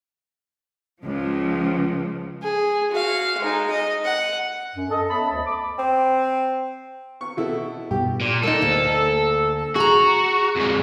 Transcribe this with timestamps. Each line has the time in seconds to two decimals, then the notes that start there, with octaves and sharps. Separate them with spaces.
1.00 C#2 F3
2.42 G#4
2.91 F#4 F5
3.40 G#3 D#4
3.70 D#5
4.05 F#5
4.75 F#2
4.90 A4 D#5
5.09 B3 C#5 E5 A5 B5
5.30 D2 D#5
5.46 D6
5.79 C4
7.21 C#6
7.37 B2 E4 A4
7.91 G2 B2 G4
8.21 A#2
8.43 A#3 D#4 A4
8.62 D2 A#3
9.76 F#4 G#4 A#5
10.57 F2 G#3